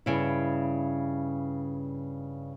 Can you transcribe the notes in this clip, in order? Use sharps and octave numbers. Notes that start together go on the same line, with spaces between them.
G2 C#3 E4